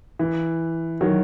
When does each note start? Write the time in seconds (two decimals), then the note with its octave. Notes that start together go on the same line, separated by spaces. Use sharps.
0.19 E3
1.01 D#3 F#3